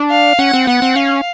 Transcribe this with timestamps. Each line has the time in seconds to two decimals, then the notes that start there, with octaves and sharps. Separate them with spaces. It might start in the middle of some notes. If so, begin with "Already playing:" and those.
Already playing: D4
0.11 F5
0.39 C#4 F#5
0.53 C4
0.67 B3 F#5
0.82 C4
0.95 C#4 F5